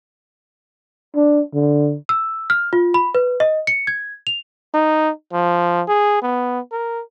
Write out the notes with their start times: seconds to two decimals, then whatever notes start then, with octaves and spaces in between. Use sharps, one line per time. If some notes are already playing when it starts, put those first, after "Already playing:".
1.16 D4
1.54 D3
2.09 E6
2.50 F6
2.73 F4
2.94 B5
3.15 B4
3.40 D#5
3.67 C#7
3.87 G#6
4.27 F7
4.74 D#4
5.33 F3
5.88 G#4
6.22 B3
6.72 A#4